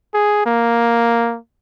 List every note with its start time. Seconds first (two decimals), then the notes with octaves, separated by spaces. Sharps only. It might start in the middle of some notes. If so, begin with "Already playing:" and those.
0.14 G#4
0.46 A#3